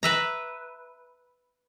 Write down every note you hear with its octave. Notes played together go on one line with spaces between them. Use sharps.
B4 E5 A#5